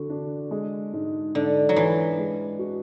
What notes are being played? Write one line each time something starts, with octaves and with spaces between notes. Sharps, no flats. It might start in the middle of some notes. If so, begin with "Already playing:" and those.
Already playing: D3 F#4
D4
G#3
G#2
G#2 D3
F#3
E3 D4
G#3
F#4